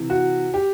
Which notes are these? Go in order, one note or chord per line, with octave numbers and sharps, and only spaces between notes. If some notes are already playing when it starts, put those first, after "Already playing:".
Already playing: C3 E3
F#4
G4